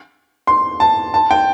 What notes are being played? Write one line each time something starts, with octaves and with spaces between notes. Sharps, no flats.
C6
A5
A5
G5